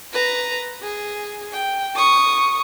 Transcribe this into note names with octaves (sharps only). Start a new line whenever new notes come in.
B4 A#5
G#4
G5
C#6 D#6